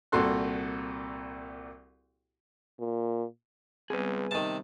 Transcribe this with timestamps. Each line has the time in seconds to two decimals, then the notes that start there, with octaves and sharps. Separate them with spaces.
0.12 C2 A#2 F#4 A4 C6 F#6
2.79 A#2
3.90 C#2 G3 B3 C4 G#4 B4
4.31 C3 D#3 A5